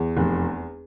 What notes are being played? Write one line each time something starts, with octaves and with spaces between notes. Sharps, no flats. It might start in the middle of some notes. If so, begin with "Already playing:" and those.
Already playing: E2
F1